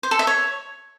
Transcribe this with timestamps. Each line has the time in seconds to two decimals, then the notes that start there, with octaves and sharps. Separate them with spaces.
0.03 C5
0.11 A4
0.19 E5
0.27 C#5